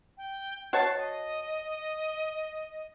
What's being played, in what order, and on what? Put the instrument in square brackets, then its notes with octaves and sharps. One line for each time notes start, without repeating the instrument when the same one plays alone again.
[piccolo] G5
[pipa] F#4 C#5 A5 [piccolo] C7
[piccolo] D#5